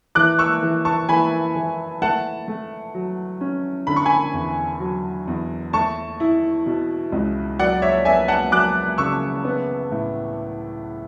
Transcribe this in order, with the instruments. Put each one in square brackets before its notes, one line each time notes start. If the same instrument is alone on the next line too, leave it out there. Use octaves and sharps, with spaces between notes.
[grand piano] E3 [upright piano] D6 F#6
[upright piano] C#6 E6
[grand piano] E3
[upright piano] A5 C#6
[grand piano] E3 [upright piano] G#5 B5
[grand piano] E3
[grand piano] A3 [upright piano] F#5 A5
[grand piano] A3
F#3
C#4
[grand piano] D3 [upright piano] B5
[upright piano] C#6
G#5 B5
[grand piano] E2
F#3
E2
[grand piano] A3 [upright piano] A5 C#6
[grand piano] E4
B2
C#2
[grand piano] F#3 [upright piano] D5 F#5
[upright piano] C#5 E5
[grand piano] B3 [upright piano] E5 G#5
[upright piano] F#5 A5
[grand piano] F#3 [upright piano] D6 F#6
[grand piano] C#3 [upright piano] C#6 E6
[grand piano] B3
A2